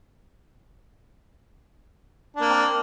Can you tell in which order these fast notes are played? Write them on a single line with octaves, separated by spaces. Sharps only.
D4 A#3 C4